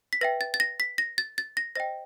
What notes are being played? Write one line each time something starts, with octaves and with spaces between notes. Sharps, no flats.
B6
B4 E5 G5 A#6
A6
A6
A#6
B6
A#6
A6
A6
A#6
C5 D#5 G5 A#6